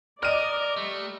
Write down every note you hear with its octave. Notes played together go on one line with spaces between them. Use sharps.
A#4 D5 D#5 F6 D#7
G3 A3